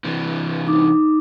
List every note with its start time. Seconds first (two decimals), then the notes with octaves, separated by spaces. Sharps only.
0.05 C3 E3
0.67 D#4 D6